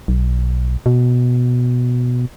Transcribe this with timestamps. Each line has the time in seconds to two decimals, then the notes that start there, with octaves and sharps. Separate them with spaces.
0.08 B1
0.86 B2